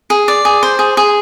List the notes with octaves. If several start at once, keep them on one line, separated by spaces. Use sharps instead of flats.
G#4
D5
G#4
C5
G#4
G#4